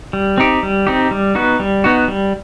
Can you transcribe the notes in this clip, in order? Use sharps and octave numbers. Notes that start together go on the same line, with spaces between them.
G3
C4 D#4 G4
G3
C4 D#4 G4
G3
B3 D#4 F#4
G3
B3 D#4 F#4
G3